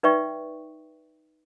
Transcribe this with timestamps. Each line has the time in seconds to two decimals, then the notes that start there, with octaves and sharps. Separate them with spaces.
0.03 D#4 B4 D5 E5 G5 C#6